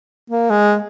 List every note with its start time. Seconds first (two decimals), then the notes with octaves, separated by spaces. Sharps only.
0.30 A#3
0.50 G#3